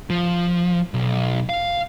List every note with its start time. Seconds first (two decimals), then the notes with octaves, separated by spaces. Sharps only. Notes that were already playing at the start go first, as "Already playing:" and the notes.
0.10 F3
0.94 B1
1.49 F5